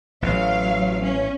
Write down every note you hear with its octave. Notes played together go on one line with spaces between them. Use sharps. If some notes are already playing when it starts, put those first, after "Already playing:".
A1 F#3 F5
C#4